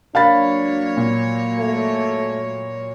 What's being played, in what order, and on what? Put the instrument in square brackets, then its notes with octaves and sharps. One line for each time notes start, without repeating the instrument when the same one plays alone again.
[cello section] F#3 A#3 C#5 [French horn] D4 [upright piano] A#4 [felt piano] F5 B5 A6
[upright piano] A#2
[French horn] A3